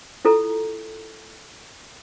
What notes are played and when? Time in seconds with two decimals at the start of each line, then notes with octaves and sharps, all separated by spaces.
0.25 E4 F4 A4 A#5